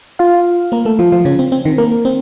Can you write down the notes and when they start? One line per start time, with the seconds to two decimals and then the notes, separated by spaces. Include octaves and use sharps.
0.19 F4 F5
0.72 A#3 A#4
0.85 A3 A4
0.99 F3 F4
1.12 F3 F4
1.25 C#3 C#4
1.39 C4
1.52 C4
1.65 D#3 D#4
1.78 A#3 A#4
2.05 C4